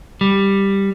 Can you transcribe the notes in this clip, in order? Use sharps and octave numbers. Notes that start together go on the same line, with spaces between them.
G3